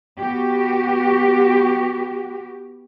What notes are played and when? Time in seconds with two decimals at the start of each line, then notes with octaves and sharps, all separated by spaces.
0.18 B3 F#4 G4